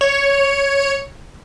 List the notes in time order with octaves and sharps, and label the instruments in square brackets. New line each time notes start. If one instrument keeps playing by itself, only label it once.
[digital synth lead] C#5